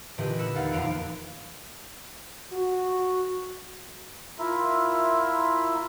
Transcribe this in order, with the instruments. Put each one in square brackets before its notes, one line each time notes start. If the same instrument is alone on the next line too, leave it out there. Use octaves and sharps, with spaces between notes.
[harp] A#2 D3 E3 G4 B4 D#5
B5 E6 F#6 C#7
D#2 D#4 F5 F#5 A6
D#1 F2 B3 F5 D7
[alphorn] F#4
[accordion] E4 F4 A#4 E5